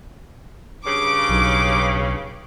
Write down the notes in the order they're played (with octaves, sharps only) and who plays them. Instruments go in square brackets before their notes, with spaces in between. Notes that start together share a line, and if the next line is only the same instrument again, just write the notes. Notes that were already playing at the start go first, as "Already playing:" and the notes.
[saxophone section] G2 C#3 [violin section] D6
[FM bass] B1